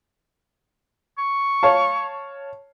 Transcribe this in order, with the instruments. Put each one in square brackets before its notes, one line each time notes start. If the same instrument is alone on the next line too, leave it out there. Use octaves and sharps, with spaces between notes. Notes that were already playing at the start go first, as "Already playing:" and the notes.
[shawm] C#6
[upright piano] C#5 F5 A5